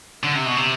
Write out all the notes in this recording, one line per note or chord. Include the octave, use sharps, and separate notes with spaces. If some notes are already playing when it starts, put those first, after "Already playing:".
D3
C3
B2
C3